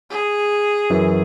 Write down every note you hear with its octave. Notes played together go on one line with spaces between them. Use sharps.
G#4
F#2 E3